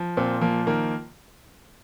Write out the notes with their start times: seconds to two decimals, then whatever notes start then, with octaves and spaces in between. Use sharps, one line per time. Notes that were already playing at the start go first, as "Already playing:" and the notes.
Already playing: F3
0.17 A#2 C4
0.41 F3 A#3
0.67 D#3 A#3